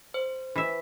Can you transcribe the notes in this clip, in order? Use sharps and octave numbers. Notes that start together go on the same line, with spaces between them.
C5
E3 E5